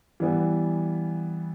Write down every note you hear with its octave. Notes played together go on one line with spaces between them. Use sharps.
E3 G3 B3